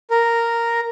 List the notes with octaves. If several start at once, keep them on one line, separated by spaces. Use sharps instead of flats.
A#4